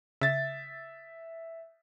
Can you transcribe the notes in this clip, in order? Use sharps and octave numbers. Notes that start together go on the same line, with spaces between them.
C#3 E5 A6